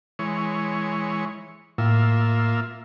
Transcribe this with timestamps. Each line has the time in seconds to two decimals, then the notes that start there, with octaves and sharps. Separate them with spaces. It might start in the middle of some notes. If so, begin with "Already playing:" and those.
0.19 E3 G#3 C#5
1.78 A2 A#3 F4 E5